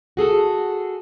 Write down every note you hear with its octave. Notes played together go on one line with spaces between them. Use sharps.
F#4 G#4 A4